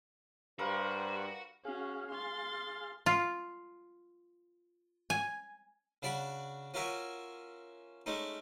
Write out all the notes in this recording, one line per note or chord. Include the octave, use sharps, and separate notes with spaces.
G2 F#4 G4 A#4 C5 F5 B5 C6
C#4 F#4 G#4 F5
C6 A6
F4
G#5
C#3 D4 F#4 D5 F#5 B5
C#4 F4 F#4 A#4 E5 G#5
G#3 A3 C#4 D#4